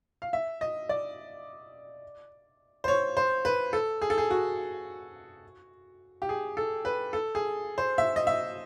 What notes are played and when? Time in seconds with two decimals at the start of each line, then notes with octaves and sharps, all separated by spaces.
0.22 F5
0.33 E5
0.61 D#5
0.89 D5
2.84 C5
2.88 C#5
3.17 C5
3.45 B4
3.73 A4
4.02 G#4
4.10 A4
4.18 G#4
4.31 F#4
6.22 G4
6.29 G#4
6.57 A4
6.85 B4
7.13 A4
7.35 G#4
7.78 C5
7.98 E5
8.16 D#5
8.27 E5